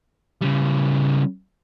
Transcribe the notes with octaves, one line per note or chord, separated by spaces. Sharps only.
C#3 G3